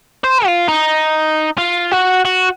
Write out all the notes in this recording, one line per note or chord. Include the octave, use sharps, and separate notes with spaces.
C5
F4
D#4
F4
F#4
F#4